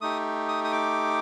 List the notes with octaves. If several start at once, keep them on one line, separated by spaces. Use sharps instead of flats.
A3 D#4 G4 D#6
D#6
D#6
D6